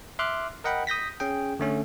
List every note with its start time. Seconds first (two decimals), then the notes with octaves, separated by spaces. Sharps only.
0.19 E5 C6 D6 F6 F#6
0.64 A#4 D#5 F#5 G5 B5
0.87 D#6 G6 A#6 B6
1.20 C#4 G#4 G5
1.59 D3 A3 C#4